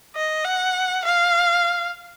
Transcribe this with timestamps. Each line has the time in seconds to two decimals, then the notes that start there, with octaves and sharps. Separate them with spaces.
0.16 D#5
0.45 F#5
1.05 F5